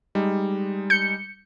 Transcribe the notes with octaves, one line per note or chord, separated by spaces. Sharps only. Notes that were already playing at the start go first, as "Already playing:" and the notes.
G3 G#3 D#4
G6 C#7